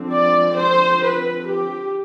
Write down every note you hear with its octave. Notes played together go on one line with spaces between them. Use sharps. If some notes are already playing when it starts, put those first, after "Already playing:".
Already playing: D3 F3 C4
D5
C5
B4
G4